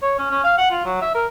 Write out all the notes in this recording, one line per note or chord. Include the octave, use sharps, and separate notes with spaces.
C#5
C#4
C#4
F5
F#5
F4
F#3
E5
A#4